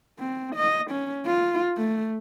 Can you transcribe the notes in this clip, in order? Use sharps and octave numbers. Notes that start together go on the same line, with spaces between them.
C4
D#5
C#4
F4
A3